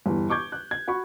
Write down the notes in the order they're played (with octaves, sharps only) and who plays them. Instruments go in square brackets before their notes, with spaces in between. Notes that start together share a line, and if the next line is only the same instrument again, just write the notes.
[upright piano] G1 E2 E3
C#6 D6 G6 G#6
F#6
G#6
F#4 B5 C#6